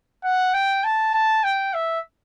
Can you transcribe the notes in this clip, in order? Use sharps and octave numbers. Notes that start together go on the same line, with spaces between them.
F#5
G5
A5
A5
G5
E5